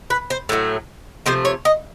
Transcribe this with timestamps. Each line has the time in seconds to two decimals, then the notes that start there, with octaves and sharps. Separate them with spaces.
0.10 B4
0.30 C5
0.49 A2 F#3 A3
1.26 C3 F3 A3 C5
1.45 C#5
1.65 D#5